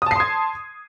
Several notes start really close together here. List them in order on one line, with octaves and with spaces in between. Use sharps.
D#6 A5 C7 C6 G#6